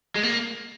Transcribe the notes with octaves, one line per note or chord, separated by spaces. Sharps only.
G#3
A#3